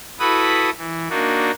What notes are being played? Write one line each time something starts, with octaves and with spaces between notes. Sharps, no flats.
E4 F#4 A4 B4 B5 D#6
E3
A#3 D4 D#4 F#4